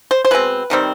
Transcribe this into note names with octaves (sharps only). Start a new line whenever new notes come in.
C5
C5
B2 G#3 C4 B4
C3 D#3 G3 C4